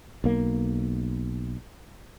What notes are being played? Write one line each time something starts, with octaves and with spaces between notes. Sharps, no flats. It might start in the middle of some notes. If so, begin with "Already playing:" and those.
B1 A#3